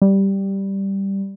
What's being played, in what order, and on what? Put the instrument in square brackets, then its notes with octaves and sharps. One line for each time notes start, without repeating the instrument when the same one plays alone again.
[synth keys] G3